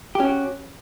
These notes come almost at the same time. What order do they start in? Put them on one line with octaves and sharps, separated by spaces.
G4 C#4 F#4